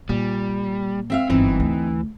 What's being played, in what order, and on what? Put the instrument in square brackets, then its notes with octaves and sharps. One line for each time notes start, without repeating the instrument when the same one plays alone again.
[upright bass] A#2 [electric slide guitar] G3
[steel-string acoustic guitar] C4 E5 F5
[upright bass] G1 F#2 [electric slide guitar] E3 [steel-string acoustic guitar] C4 D#4
[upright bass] D2